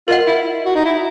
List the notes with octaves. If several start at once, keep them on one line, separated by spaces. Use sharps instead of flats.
F4 A#4 D#5 F#5
E4
F#4
D#4
E4